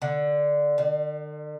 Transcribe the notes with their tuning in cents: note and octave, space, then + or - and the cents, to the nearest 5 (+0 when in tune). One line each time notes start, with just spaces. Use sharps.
D3 +5
D3 +45